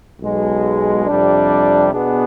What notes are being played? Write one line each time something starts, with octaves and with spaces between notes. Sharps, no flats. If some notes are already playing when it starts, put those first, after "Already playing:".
B1 B2 G#3
F2 C3 G3 D4
B2 B3 D4 G#4